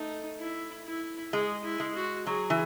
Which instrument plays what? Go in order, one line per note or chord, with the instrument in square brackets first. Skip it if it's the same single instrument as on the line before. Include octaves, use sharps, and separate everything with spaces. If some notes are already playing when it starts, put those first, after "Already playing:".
Already playing: [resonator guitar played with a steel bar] A3 [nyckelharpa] D#4
[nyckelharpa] E4
E4
[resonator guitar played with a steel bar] G#3 [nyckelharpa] G#4
[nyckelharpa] E4
[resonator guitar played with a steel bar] G#3
[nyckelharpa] F#4
[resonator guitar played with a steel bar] F#3 [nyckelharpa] G#4
[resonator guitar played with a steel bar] E3